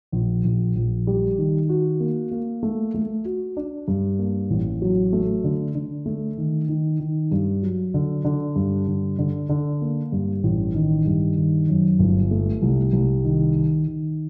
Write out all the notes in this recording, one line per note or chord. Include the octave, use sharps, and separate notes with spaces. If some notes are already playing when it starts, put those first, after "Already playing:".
A#1
A#1
A#1
G3
D#3
F#4
A#3
A#3
A3
A3
F#4
D4
G2
A#3
A1
F#3
A3
D3
D3
A3
D#3
D#3
D#3
G2
F#3
D3
D3
G2
D3
D3
D3
A#3
G2
A1
D#3
G2
D#3
F#2
G1
A3
C2
C2
D#3
D#3
D#3